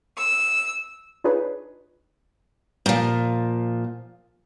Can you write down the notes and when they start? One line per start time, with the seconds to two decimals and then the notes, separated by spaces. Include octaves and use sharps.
0.16 E6
1.24 D4 D#4 F4 G#4 B4 C#5
2.86 A#2 F3